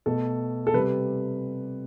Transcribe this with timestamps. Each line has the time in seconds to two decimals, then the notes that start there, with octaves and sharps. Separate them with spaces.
0.06 B2 A3 A4
0.67 A4
0.74 C3 G3 B4